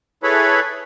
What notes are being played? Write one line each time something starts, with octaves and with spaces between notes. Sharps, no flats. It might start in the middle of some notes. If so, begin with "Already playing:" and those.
E4 G#4 A4 B4 C#5 B5